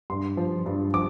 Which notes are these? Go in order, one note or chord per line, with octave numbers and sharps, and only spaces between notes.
G2 C6
F3
G2
F3 D6